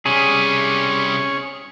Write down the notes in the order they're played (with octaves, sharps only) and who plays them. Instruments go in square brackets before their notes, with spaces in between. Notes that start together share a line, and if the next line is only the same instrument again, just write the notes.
[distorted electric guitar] C3 G3 [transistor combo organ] C#4 C#5 C#6 [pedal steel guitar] G#4